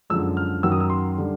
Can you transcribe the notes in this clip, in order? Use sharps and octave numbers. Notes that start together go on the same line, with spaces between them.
F#2 D3 F3 G#3 E6
F6
F#2 D#3 F#3 E6
D#6
E6
C6
D3 G3